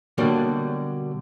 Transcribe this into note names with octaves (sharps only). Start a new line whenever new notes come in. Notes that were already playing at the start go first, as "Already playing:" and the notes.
B2 D3 F#3 G3 A#3 F#4